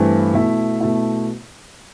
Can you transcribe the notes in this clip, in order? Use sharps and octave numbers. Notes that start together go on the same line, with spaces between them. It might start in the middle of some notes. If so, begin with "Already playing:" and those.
Already playing: G2 E3 A3 C4
B2 A3 E4
B2 A3 E4